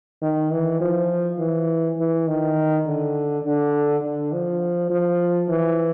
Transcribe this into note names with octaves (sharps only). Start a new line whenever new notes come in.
D#3
E3
F3
E3
E3
D#3
D3
D3
D3
F3
F3
E3